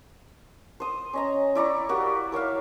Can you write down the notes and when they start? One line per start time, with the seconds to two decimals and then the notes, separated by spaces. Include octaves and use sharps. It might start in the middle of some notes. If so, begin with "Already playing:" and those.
0.80 C5 D#6
1.13 C#4 D#5 A#5
1.55 E4 D5 A#5 C#6
1.89 A#3 F#4 G4
2.32 A#4 C#5 E5 F5